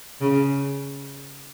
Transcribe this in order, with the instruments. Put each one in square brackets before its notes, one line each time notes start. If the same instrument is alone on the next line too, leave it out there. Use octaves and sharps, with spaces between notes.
[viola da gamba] C#3